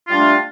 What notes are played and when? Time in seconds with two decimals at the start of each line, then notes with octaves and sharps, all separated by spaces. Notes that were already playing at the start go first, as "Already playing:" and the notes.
0.07 F4
0.10 G3
0.13 D4
0.16 A3